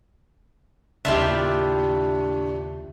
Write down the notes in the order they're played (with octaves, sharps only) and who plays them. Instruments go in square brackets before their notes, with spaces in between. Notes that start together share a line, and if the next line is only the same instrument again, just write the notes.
[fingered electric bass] D#2 C#3 [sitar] A2 G4 [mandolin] D4 [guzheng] E4 F4 E5